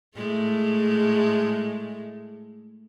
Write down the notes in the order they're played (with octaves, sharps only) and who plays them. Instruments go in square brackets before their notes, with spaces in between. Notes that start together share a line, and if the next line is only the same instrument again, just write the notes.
[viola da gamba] A2 G#3 A3